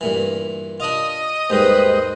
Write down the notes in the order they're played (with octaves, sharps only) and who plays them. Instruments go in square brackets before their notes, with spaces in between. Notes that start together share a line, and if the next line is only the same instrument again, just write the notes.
[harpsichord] G2 A#2 E3
[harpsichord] D4 F4 [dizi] D#5
[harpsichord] D#2 G#2 G3 [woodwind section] B4 C5